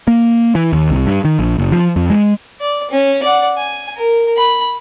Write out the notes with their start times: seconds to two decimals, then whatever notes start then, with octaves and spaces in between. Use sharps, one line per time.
0.08 A#3
0.55 E3
0.73 D#2
0.91 C2
1.07 G2
1.25 D#3
1.39 A#1
1.58 F#1
1.72 F3
1.96 F2
2.10 G#3
2.60 D5
2.91 C#4
3.23 D5 F#5
3.58 G#5
3.96 A#4
4.37 B5